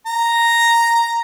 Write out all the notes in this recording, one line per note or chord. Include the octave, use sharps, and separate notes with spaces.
A#5